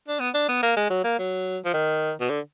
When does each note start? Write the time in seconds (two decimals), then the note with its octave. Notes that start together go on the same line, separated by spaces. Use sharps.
0.08 D4
0.20 B3
0.34 D4
0.49 B3
0.63 A#3
0.77 G#3
0.90 F#3
1.04 A#3
1.19 F#3
1.65 F3
1.74 D#3
2.21 B2
2.30 D3